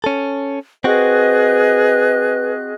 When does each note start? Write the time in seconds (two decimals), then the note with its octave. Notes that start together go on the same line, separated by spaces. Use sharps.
0.04 C#4 A4
0.84 C4 F#4 G#4 B4 D#5 F#6